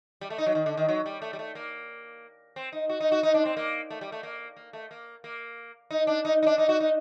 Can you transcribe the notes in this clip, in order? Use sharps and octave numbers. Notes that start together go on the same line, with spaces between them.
G3
A3
D#4
F#3
D#3
D3
D#3
F#3
G3
A3
G3
A3
A#3
C4
D#4
F#4
D#4
F#4
D#4
D4
C4
A#3
A3
G3
A3
A#3
A#3
A3
A#3
A#3
D#4
D4
D#4
D#4
D4
D#4
F#4
D#4